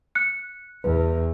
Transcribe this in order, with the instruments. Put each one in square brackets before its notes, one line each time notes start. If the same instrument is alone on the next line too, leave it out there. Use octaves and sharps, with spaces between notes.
[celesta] F#6 C#7
[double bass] E2 [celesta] B4